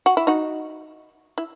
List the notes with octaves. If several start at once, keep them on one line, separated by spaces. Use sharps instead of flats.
F#4
E4
D#4 F#4
E4